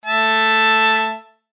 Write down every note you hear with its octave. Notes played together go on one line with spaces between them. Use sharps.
A3 E5 A5